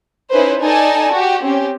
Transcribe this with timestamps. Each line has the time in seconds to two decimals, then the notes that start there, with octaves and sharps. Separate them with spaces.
0.30 C#4 D#4 E4 B4 C5
0.61 D#4 A4 D5 G#5 A5
1.13 F#4 G4
1.42 C4 C#4 G4